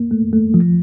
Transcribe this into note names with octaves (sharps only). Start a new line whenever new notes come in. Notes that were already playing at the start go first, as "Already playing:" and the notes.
Already playing: A#3
A3
A3
F3